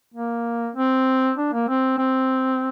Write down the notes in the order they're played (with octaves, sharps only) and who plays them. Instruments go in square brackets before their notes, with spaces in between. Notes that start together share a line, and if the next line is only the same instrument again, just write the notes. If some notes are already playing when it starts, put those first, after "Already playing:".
[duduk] A#3
C4
D4
A#3
C4
C4